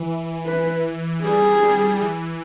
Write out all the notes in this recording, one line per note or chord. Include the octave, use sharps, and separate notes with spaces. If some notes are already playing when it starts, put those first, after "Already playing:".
Already playing: E3
B4
G3 G#4
G3
E3